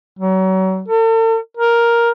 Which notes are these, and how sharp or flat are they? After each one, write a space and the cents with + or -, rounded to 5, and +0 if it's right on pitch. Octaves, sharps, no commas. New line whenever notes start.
F#3 +35
A4 +45
A#4 +5